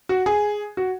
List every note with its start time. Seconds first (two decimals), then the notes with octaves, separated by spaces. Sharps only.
0.09 F#4
0.26 G#4
0.77 F#4